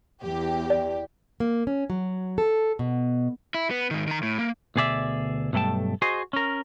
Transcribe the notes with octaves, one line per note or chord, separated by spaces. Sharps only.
E2 G4
D5
A#3
C#4
F#3
A4
B2
E4
B3
G#2 D#3
D#3 A#5
A2
A#3
D2 B2 G#4 D5 E5
B1 G2 A3 A4 G5 A5
F#4 G#4 C5 D#5
C#4 A#4